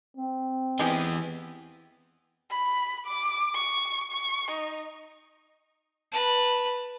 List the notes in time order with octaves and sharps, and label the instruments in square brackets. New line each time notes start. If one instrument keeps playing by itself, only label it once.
[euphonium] C4
[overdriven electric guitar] E3 B3 [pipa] G#3 G4
[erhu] B5
D6
C#6
C#6
D#4
[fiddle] B4 A5